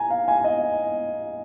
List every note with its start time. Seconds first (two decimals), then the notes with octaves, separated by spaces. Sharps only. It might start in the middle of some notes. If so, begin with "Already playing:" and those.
Already playing: G#5 A#5
0.10 F5
0.28 G#5
0.44 D#5